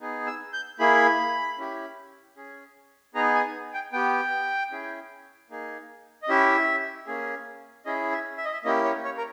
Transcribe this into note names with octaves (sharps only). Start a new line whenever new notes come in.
B3 D#4 G#4
E6
G6
A#3 E4 G#4 B5
C#4 E4 G4
C#4 G#4
B3 D#4 G#4 A#5
G#5
G5
B3 G4 G5
C#4 E4 G#4
A#3 D#4 G#4
D#5
C#4 E4 G4 E5
A#3 C#4 G#4
C#4 E4 G#4 D#5
E5
E5
D#5
E5
A#3 C#4 E4 G4 D#5
C#5
C#5
A#4